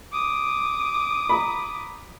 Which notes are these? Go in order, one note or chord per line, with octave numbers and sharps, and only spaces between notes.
D6 D#6
A#5 B5